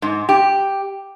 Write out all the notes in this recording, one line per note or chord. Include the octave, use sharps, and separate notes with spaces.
G#2
G4